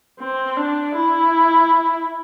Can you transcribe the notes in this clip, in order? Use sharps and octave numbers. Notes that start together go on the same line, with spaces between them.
C4
D4
E4